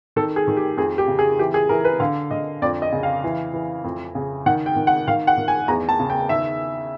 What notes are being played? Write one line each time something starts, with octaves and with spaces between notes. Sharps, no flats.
D#3 A4
G#4
D#3
G4
F2 G#4
G4
C#3
G#4
E3 G4
G#4
E3 A#4
B4
D3 F5
D3 D#5
F2 D5
D#5
C#3
F5
E3
E3
F2
C#3
D#3 F#5
G5
D#3
F#5
D#3 F5
F#5
D#3
G#5
E2 A#5
A5
C#3
G5
D#3 E5